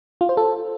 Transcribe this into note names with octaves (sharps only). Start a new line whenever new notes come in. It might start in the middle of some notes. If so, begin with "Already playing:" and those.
F4
C5
A4